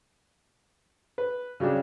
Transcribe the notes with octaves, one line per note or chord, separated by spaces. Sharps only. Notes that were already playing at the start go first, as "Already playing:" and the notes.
B4
C#3 F#3 G3 D4